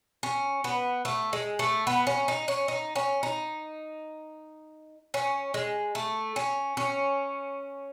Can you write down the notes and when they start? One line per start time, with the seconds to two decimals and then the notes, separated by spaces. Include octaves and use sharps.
0.23 C#4
0.64 B3
1.05 A3
1.33 G#3
1.59 A3
1.87 B3
2.07 C#4
2.28 D#4
2.48 C#4
2.68 D#4
2.96 C#4
3.23 D#4
5.14 C#4
5.54 G#3
5.95 A3
6.36 C#4
6.77 C#4